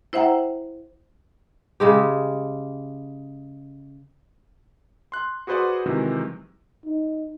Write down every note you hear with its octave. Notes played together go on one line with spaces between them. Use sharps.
E4 C5 E5 F#5 G5 A#5
C#3 G#3 G4
C6 F#6
F#4 G#4 B4 C5 D5 F#5
C3 D#3 E3 F#3 G#3 C4
D#4